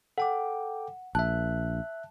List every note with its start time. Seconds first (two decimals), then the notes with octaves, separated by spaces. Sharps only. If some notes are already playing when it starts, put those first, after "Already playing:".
0.18 A4 F#5 G5 D6
1.15 A#1 E5 A5 F#6